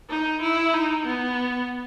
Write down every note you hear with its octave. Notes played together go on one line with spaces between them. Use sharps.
D#4
E4
D#4
B3